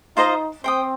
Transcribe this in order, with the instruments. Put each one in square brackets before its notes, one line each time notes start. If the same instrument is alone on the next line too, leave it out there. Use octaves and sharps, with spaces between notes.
[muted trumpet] D#4 [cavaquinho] F4 C5 D#5 A#5
[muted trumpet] C4 [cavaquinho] C5 G5 D#6